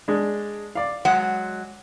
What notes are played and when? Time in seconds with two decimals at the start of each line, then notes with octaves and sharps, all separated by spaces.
0.08 G#3 D4
0.75 D5 F5
1.05 F#3 G#3 F#5